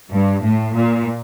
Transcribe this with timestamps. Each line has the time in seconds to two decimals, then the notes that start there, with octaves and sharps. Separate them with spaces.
0.11 G2
0.43 A2
0.75 A#2